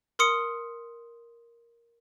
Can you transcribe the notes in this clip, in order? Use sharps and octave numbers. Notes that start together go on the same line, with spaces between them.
A#4 C6 D#6 C#7